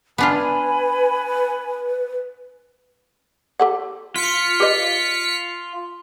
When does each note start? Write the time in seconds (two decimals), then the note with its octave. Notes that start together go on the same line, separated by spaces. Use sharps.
0.18 B3 D4 F4 B4 G#5 B5
3.60 G4 A4 F#5
4.16 F4 B6 C#7
4.60 G4 B4 D#5